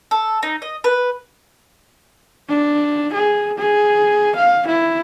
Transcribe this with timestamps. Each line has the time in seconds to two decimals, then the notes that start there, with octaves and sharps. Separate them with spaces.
0.11 A4
0.43 D#4
0.62 D#5
0.84 B4
2.49 D4
3.13 G#4
3.58 G#4
4.36 F5
4.67 E4